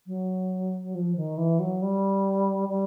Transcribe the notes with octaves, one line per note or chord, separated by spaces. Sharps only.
F#3
F3
D#3
E3
F#3
G3
G3